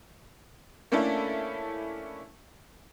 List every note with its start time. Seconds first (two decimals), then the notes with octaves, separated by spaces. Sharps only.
0.92 A3 A#3 C#4 D4 E4 A4